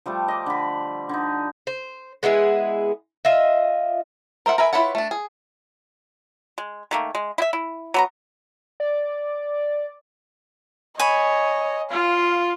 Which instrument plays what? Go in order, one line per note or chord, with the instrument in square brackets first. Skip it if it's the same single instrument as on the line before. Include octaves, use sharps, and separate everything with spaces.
[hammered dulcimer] F3 G3 A3
D#5 D6
D3 B5
D3 D#4
[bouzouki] C5
G#3 B3 E4 G#4
F4 D#5 E5
[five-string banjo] A#4 C5 E5 F#5
A#4 B4 E5 G#5
E4 F4 B4 C#5 F#5
A3 D4
G#4
[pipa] G#3
D#3 A3 A#3
G#3
E4 E5
E4
F#3 B3 A#5
[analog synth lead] D5
[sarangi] C#5 [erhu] D#5 [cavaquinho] G#5 B5
[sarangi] F4 [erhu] F5